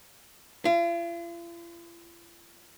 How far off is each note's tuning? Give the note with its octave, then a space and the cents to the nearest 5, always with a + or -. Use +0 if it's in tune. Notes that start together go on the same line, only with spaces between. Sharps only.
F4 -45